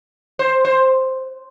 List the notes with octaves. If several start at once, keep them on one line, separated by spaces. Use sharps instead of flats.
C5
C5